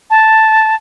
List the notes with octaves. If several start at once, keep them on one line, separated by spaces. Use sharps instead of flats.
A5